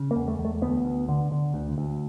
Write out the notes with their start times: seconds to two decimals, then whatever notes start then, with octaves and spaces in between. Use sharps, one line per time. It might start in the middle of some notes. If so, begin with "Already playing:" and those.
Already playing: C#3
0.11 A#3
0.16 E2
0.28 A3
0.39 E2
0.45 A3
0.62 D2 B3
0.85 D2
1.09 D3
1.32 D3
1.54 D2
1.78 D2